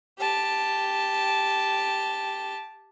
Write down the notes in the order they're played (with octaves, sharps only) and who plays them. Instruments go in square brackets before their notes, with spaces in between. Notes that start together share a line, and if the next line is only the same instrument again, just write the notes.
[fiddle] G4 A5